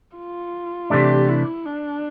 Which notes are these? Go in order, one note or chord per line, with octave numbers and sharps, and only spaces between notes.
F4
C3 E3 A3 D4 G4
E4
D4